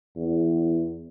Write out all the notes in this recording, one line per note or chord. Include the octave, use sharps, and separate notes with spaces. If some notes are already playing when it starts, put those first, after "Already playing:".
E2